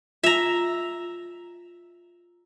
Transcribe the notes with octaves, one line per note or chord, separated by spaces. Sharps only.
F4 E5 A#5